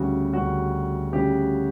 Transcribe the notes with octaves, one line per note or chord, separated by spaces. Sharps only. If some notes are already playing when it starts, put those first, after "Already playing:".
Already playing: D2 C#3 G3 C#4 F#4
D2 C#3 G3 C#4 F#4
D2 C#3 G3 C#4 G4